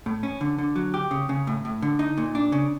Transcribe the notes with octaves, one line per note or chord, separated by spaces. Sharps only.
A2
C#4
D3
D3
F#3
G4
C#3
C#3
A2
A2
D3
D#4
A#2
D4
C#3